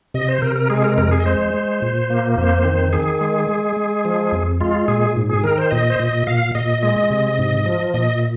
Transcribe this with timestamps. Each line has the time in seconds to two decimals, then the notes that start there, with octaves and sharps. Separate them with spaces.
0.14 C3 D#5
0.28 C5
0.42 C3 A#4
0.56 A#4
0.70 G#3 G#4
0.84 A#4
0.98 F2 A#4
1.11 G#4
1.20 D#5
1.26 G#3 C5
1.54 G#3
1.82 A#2
2.10 A#3
2.37 F2 C5
2.65 D#3
2.93 D#3 G#4
3.21 G#3
3.48 G#3
3.76 G#3
4.05 F3
4.32 F2
4.61 G#3 F4
4.88 A#2 G#4
5.16 G#2
5.29 G#4
5.44 D#3 A#4
5.58 C5
5.71 A#2 D#5
5.90 C5
5.99 A#2 D#5
6.27 A#2 F5
6.55 A#2 D#5
6.82 G#3 D#5
7.10 C3
7.39 G#2
7.66 F3
7.94 A#2 D#5